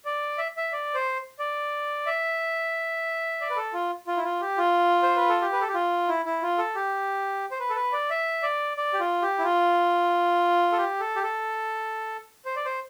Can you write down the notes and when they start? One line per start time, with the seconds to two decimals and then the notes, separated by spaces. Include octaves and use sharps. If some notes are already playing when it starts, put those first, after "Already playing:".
0.05 D5
0.38 E5
0.57 E5
0.72 D5
0.94 C5
1.39 D5
2.06 E5
3.41 D5
3.50 B4
3.56 A4
3.74 F4
4.07 F4
4.17 E4
4.23 F4
4.41 G4
4.58 F4
5.03 C5
5.16 B4
5.29 A4
5.42 G4
5.53 B4
5.61 A4
5.68 G4
5.74 F4
6.08 E4
6.25 E4
6.42 F4
6.58 A4
6.75 G4
7.51 C5
7.60 B4
7.70 A4
7.76 B4
7.92 D5
8.10 E5
8.43 D5
8.77 D5
8.93 G4
9.00 F4
9.22 G4
9.38 E4
9.43 F4
10.72 A4
10.77 G4
11.00 A4
11.16 G4
11.23 A4
12.45 C5
12.56 D5
12.65 C5